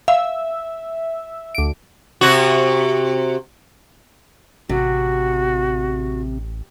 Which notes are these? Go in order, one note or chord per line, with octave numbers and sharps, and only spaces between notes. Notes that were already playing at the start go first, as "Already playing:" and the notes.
E5 F5
D2 D7
C3 F#4
A1 C3 F#4